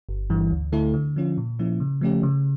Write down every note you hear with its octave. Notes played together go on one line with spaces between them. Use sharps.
G1
G2 E3
D2
D3 A3 E4 A4
D3
F3 C#4 F4
A#2
F3 A#3 C#4 E4
C#3
F3 A3 C#4 G4
C#3